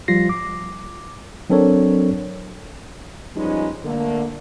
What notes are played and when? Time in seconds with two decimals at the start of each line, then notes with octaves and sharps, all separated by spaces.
0.08 F3 G3 F4 A#6 C7
0.29 D6
1.50 F#3 C4 D4 A4 A#4 C#5
3.36 F3 G3 G#3 B3 C#4 D#4
3.84 D3 A3 A#3